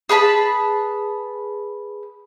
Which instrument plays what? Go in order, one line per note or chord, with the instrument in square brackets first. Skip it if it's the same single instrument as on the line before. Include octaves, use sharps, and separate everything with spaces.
[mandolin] G#4 B4 A5 B5